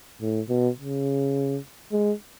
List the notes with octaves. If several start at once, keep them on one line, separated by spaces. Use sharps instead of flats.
A2
B2
C#3
G#3